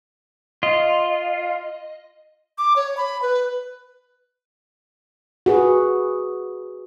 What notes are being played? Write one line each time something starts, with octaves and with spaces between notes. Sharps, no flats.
F4 D#5
D6
C#5
B5
B4
F#4 G#4 B4